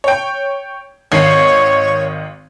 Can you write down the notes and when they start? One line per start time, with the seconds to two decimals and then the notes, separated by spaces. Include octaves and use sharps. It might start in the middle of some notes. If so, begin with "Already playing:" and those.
0.04 C#5 G5
1.12 G#1 D#3 C#5 C7